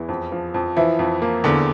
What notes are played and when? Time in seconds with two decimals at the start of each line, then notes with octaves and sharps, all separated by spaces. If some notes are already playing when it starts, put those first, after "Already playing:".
Already playing: E2 E3 E4
0.09 F2
0.32 F3
0.54 F2
0.77 E3 F3 E4
0.99 F2
1.22 A#3
1.44 E2 D3 D4